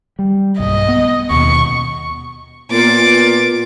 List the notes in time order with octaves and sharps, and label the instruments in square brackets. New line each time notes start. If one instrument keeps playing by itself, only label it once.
[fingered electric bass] G3
[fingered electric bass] B1 G2 [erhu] D#5
[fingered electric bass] B3
[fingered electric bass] D#2 B2 [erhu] C#6
[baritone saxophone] A#2 [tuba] B3 [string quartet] D6 A6